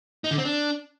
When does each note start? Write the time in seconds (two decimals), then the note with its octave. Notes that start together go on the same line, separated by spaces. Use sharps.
0.24 D#4
0.31 D3
0.38 C4
0.45 D4